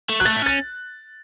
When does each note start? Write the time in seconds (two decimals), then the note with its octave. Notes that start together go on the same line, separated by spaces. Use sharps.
0.10 A3
0.20 F#3 F#6
0.25 A3 A6
0.37 E4
0.42 C#4 A6